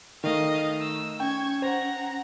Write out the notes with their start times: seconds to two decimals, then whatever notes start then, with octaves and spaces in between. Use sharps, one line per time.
0.24 D#3 A3 D#5 F5
0.80 E6
1.20 C#4 G5 C#6 G#6
1.62 C5 F#5 A#5